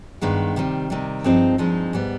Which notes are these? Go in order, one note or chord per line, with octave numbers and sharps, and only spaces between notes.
G2 D#3 G#3 B3
C3 D#3 G3
C3 D#3 G3
G2 F3 G#3 C4 D#4
G2 F3 G#3 C4 D#4
G#2 G3 B3